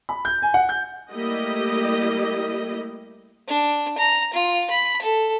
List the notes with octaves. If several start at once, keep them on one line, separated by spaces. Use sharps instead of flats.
B5
G6
G#5
F#5
G6
G3 A3 A#3 E4 G4 D#5
D4
A#5
F4
B5
A4